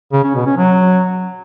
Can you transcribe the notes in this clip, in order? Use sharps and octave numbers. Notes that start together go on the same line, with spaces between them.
C#3
C#4
B2
C#4
F#3